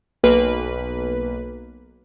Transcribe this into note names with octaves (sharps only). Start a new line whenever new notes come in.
B1 A#3 B4